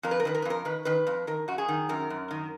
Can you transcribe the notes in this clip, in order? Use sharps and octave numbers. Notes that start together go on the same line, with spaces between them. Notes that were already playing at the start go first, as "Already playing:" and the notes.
F2 A#4
B4
A#4
D#3 B4
A#4
B4
F2 A#4
D#3 B4
D#3 B4
F2
D#3 A#4
F#2 F#4
G#4
D#3
F#2 A#4
F#2
D#3